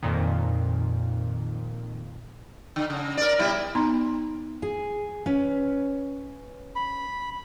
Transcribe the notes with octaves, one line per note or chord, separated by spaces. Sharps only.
F2 A#2 D#3
D3
C#3
A#4 D5
B2 G3 E4
B3 D#4 A#5 C6
G#4 G#5
C#4 B4
B5